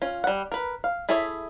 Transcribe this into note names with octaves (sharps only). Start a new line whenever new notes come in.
C#4 F4
G3 F#5
A#4 B4
F5
E4 G#4 A4 C#5 E5